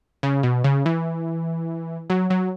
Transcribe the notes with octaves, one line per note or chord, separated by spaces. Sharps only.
C#3
B2
C#3
E3
F#3
F#3